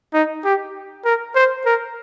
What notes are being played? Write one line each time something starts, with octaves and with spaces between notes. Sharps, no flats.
D#4
G4
A#4
C5
A#4